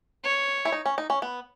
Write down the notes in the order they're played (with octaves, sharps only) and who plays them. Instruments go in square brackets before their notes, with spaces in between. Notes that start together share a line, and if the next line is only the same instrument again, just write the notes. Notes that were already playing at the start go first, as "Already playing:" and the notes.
[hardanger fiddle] C#5
[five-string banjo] E4
D#4
C#4
D#4
C#4
B3